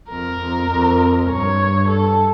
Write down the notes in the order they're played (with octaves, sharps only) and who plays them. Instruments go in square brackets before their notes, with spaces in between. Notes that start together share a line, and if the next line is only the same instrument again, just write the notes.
[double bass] F2 [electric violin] A#4
[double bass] F2
F2
[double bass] G2 [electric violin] C#5
[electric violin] A4